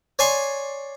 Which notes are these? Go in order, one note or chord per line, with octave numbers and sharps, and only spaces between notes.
C#5 D5 G#5 C6 C#6